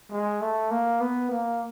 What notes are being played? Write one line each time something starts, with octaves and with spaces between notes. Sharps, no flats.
G#3
A3
A#3
B3
A#3